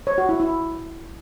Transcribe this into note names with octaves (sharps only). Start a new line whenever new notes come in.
C#5
F#4
E4
E4